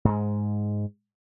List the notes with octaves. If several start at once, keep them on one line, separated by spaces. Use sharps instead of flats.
G#2 G#3